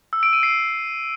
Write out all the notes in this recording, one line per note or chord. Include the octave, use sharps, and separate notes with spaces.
E6
D7
D#7
C7